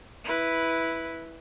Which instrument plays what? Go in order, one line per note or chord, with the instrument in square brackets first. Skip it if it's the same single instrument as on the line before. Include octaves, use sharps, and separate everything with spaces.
[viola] E4 B4